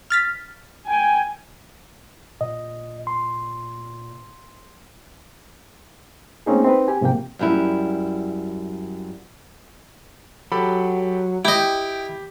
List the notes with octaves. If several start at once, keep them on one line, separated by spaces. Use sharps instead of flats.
F6 A6 B6
G5 G#5
A#2 D#5
C6
A3 A#3 C4 C#4 D#4 G#4
C4 D#4 B4
G4 G#5
G#2 C3 F3 A#3 G5
F#2 G3 E4
F#3 G4 A4 B5
E4 G4 D#5 G5